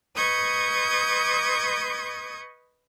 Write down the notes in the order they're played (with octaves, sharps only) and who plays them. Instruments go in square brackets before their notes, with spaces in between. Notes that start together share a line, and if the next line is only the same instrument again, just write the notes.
[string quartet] B4 D#5 C#6 D#6 G6 G#6